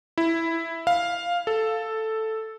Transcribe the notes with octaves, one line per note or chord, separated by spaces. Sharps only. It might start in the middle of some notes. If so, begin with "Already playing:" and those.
E4
F5
A4